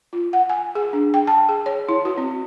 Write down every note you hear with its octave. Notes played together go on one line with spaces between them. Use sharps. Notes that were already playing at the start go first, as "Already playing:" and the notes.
F4
F#5
G#5
G#4
D4
G5
A5
G#4
C#5
E4
F#4
C4